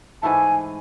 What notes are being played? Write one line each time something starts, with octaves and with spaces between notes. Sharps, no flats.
G#2 E3 A3 E4 G#5 A5